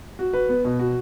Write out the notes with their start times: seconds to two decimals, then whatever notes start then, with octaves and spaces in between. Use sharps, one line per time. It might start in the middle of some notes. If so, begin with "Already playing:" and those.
0.19 F#4
0.33 B4
0.49 B3
0.65 B2
0.79 F#4